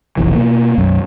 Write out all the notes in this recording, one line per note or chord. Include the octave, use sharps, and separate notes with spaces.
F1 B1 E3
B2 A#3
B1 F#2